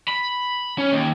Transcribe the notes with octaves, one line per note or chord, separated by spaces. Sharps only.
B5
C#4
D#2